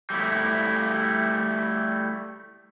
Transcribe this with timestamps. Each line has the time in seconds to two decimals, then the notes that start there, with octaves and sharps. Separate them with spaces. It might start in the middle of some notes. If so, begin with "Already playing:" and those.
0.10 G3 A3 E4